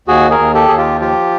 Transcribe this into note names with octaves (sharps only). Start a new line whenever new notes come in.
D#2 F#4 G#4
G#4 A#4
D#2
G4 A4
D#2 G#4
F4 G4
F3 F4 G4